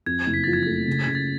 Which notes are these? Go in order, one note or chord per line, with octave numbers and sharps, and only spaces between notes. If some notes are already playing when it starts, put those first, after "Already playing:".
F2 G#6
G#6
F#1
B6
F3 A6
G#6
A3 A6
C#3
C#3 G#6
A6